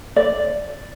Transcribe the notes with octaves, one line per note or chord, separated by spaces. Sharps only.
D5